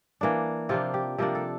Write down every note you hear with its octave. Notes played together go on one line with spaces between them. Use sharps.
E3 A#3 D4
C3 F3 A#3 D4 F4
G4
C3 F3 A#3 D4 A#4
A4